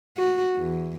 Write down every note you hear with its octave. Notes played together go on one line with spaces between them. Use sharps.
F#4
E2